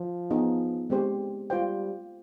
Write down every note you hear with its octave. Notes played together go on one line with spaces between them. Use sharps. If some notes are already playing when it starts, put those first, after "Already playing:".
Already playing: F3
B3 D#4 G#4
G#3 C4 G4 C5
G3 F4 C5 G5